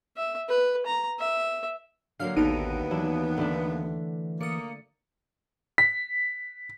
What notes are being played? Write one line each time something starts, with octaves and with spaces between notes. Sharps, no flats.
E5
B4
A#5
E5
D3 F#3 A#3 F5 F6 C7
A1 D#2 B3 D#4 A4 B4 D7 D#7
E3 F#3 D4 E4
D3 A3 D4
A#3 D5 D#6 C#7
B6